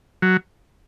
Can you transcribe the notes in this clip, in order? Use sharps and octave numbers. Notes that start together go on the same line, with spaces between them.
F#3